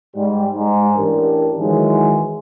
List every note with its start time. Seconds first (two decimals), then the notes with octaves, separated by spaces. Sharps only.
0.16 G#2 G3
0.53 G#2
0.97 A1 D4 G4 A#4
1.59 D#3 E3 F#3 G#3